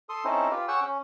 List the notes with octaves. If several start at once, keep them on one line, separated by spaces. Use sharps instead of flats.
A4 C6 D#6
C4 C#4 D#4 E4 A4 C5
F4 G4 B4
G#4 C#5 F#5 G5 C#6 E6
C#4